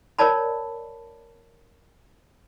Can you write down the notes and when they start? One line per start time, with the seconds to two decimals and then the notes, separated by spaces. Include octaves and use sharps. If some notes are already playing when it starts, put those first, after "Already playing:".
0.19 A#4 C#5 D5 A5 B5